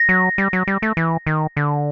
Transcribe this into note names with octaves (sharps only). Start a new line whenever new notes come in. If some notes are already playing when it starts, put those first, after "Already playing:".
Already playing: A#6
F#3
G3
F#3
G3
A3
E3
D#3
D3